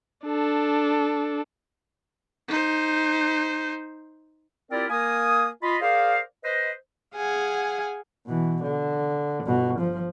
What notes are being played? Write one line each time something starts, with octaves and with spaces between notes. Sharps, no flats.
D4 A4
D#4 C5
C4 E4 F4 G4 A#4 D5
A#3 A#4 G#5 D#6
F4 D#5 B5
G#4 A#4 C5 D5 F5
B4 C5 D#5
G#4 F5 F#5 G#5
B2 E3
D3
G1 B2
F3